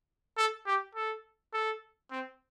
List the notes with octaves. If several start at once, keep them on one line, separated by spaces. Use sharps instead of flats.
A4
G4
A4
A4
C4